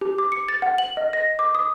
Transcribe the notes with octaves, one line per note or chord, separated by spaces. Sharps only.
G4
D6
C#7
A6
F#5
F#7
D#5
A#6
D6
D#6